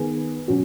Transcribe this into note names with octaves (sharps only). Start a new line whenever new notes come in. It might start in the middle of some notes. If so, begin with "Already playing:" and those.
Already playing: D#3 B3 G#4 B4
B2 F#3 C#4 F#4